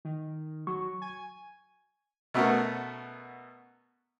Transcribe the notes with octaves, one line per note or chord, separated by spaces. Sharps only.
D#3
F#3 C#6
G#5
B2 A3 B3 C#4 F#4 A#4